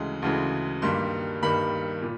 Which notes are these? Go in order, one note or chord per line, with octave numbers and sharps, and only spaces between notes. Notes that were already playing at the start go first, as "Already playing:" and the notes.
Already playing: D2 C#3 E3 G#3
D2 C#3 E3 G#3
G2 D#3 G3 A#3 C6
G2 D#3 G3 A#3 B5
A#2